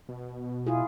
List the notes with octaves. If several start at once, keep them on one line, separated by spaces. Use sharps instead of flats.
B2
E4 F4 G#4